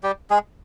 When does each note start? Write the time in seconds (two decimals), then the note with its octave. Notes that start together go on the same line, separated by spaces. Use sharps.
0.03 G3 G4
0.30 G#3 G#4